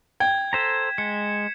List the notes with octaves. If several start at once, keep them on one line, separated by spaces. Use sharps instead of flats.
G5 G#6
A4 C5 A#5 B6 E7
G#3 C#7